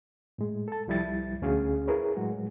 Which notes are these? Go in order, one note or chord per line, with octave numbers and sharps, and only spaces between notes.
A2 G#3
A4 A5
C2 F3 G3 E4 A6
D2 C#4 F#4 G#4 F5
E4 G#4 A#4 B4 C#5
A2 F#3 G#3 F#4